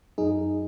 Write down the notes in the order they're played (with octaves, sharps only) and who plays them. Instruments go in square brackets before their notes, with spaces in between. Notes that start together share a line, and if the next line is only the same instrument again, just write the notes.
[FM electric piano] F#2 F#3 D#4 G#4